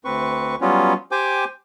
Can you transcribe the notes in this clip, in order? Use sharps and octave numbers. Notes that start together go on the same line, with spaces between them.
D2 C4 B4 C#6
F#3 G3 B3 C#4 F4
G4 C5 G5 G#5 D6